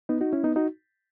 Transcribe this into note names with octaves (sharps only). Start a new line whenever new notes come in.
B3 D#4
D#4 F#4
C#4 E4
B3 D#4
D#4 F#4